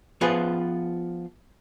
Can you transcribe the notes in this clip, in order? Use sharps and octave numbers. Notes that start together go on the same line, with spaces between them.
F3 B3 F4 G#4 B4